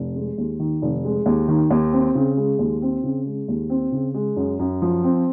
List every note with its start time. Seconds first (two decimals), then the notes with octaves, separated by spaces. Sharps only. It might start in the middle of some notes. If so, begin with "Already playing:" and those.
Already playing: F1
0.15 G#3
0.38 D#2
0.59 D#3
0.82 F1
1.05 G#3
1.26 D#2
1.48 D#3
1.70 D#2
1.93 C4
2.15 C#3
2.37 G#3
2.59 D#2
2.82 C4
3.04 C#3
3.26 G#3
3.48 D#2
3.70 C4
3.92 C#3
4.14 G#3
4.36 F#2
4.59 F#2
4.82 F3
5.04 C4